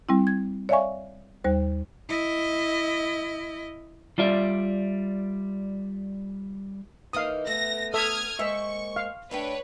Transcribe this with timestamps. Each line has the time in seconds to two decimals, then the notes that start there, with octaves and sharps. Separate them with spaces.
0.09 G3 C4 E4
0.27 G#6
0.69 C#5 D5 E5 F5 G#5 C#6
1.44 D#2 G3 C5
2.09 E4 D#5
4.18 G3 F4 D5 E5
7.13 E3 A#3 D#4 F5 D#6
7.47 A3 B3 A#6
7.94 A4 E5 D#6 F6 G#6
8.39 G#3 A#3 C5 E5 C#6
8.96 F5
9.31 A3 D4 B4 C#5 G5